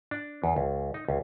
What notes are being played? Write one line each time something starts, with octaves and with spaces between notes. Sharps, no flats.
D4
E2
C#2
D#4
C#2